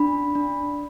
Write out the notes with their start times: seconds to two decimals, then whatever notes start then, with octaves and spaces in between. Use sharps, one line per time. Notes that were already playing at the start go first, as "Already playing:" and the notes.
Already playing: D4 B5
0.35 D4